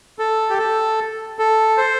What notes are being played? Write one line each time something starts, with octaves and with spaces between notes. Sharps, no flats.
A4
G4
A4
A4
C5